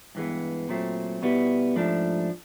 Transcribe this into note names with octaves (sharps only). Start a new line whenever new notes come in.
G2 E3 G#3 B3
A#2 F#3 A3 C4
B2 G3 B3 E4
G#2 F3 A3 D4